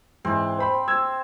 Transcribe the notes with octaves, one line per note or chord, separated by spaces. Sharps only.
G#2 E3 C4
C5 B5
E6 G#6